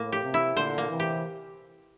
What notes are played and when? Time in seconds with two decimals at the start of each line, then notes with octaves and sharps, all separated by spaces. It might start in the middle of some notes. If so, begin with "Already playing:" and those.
Already playing: A2 A#3
0.12 G4
0.23 C3
0.34 E4
0.56 A#2 D3 C5
0.78 A#3
0.89 C3 E3
1.00 G4